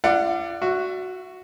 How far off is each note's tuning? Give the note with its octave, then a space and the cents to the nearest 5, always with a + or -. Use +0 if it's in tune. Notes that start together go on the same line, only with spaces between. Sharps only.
F4 -45 D5 +15 F#5 +0
F#4 +0 E5 +30